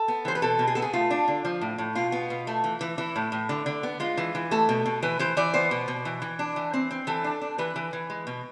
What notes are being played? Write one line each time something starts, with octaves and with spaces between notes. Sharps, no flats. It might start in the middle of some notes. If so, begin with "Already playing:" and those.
Already playing: A4
B3
E3 C5
B4
B2 A4
B2
G#4
B3 A4
G#4
A3 F4
D4
D3
F3
A2
A2
B2 F4
B3
B2
A3
E3
E3
E3 E4
A2
A2
D3
D3
B3
G#3 F4
E3
E3
A3 A4
B2
B2
E3 B4
E3 C5
E3 D5
B3 C5
B2
B2
E3
E3
D4
E3
C4
C4
E3 A4
D4
D4
E3 B4
E3
E3
G#3
B2